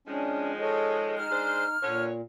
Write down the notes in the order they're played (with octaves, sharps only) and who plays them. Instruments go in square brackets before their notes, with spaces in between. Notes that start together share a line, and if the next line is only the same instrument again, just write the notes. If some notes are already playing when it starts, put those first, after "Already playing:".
[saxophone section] D#3 F3 G#3 [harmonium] C#4 D4
[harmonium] A4 C#5 D#5
[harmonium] D#4 [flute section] F6
[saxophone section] G#3 D4 C5
[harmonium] A#2 [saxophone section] D3 B4 C#5